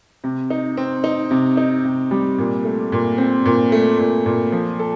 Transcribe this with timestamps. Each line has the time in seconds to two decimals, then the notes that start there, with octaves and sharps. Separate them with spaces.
0.24 C3
0.50 D#4
0.77 C4
1.04 D#4
1.31 C3
1.57 D#4
1.85 C3
2.11 G3
2.38 A#2
2.65 A3
2.92 A#2
3.18 C4
3.46 A#2
3.72 A3
3.99 A#2
4.26 A#2
4.52 F3
4.79 A4